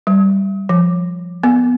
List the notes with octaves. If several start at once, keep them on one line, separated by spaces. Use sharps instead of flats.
G3
F3
B3